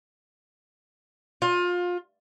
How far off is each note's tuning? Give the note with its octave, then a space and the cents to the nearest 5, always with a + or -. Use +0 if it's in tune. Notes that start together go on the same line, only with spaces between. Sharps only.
F4 +25